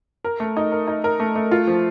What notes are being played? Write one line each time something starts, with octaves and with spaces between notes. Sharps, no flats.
A#4
A3
D#4
A#4
D#4
A#4
A3
A3
F4
F3